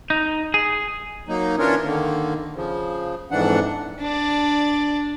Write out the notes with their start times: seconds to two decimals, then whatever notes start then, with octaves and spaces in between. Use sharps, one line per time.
0.10 D#4
0.54 G#4
1.28 F#3 A#3 D#4
1.59 E3 C#4 D4 F4 A#4 C#5
1.85 D3 D#3 A#3
2.55 C#3 F3
3.31 F2 G#2 E3 D4 F#5
4.00 D4 D5